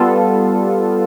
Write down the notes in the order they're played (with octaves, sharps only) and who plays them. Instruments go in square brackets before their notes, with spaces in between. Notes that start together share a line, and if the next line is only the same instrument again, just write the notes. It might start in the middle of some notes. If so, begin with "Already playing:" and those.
Already playing: [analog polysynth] G3 B3 F4 A4